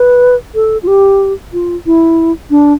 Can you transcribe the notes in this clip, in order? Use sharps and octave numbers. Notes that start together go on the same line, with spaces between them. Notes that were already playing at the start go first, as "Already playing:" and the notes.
Already playing: B4
A4
F4
G4
F4
E4
D4